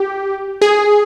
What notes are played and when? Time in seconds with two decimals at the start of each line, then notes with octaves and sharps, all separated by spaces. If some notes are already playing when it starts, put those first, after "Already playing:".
Already playing: G4
0.62 G#4